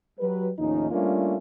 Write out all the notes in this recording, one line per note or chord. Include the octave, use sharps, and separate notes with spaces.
F#3 G3 B4
D#2 A2 F3 C#4 D#4
G3 A3 A#3 C#4 D4 F4